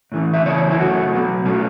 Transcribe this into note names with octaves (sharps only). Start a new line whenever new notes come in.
A2 E3 C#4
E5
C#3 E3 C#4 C#5
E4
F#2 C#3 A3 C#4 F#4
B2 F#3 B3
B2 A3 C#4